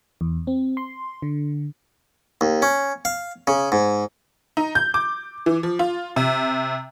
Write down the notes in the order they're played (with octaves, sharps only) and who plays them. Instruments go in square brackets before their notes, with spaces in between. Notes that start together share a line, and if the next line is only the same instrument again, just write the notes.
[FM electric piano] E2
C4
C6
D3
[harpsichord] D#2
C#4
F5
C#3
G#2
[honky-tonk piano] D#4
G6
D6
E3
F3
F4
C3